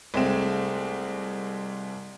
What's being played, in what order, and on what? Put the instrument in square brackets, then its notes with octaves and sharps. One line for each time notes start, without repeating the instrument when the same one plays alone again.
[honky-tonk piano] C2 G#3 A3 C4 E7